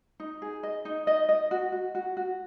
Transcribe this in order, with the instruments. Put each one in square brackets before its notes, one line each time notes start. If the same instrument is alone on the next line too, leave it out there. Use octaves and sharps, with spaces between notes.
[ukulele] D#4
G#4
D#5
D#4
D#5
D#5
F#4
F#4
F#4
F#4